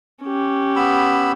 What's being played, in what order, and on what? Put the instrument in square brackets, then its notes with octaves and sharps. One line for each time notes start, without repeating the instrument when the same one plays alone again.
[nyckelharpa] C#4 G4
[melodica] B3 B5 E6